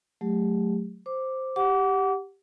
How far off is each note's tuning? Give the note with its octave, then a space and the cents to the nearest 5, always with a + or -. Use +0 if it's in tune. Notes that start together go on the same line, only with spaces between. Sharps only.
F#3 +0 A3 -20 G4 +30
C5 +0 D6 +0
G4 +0 F#5 +5 D6 -30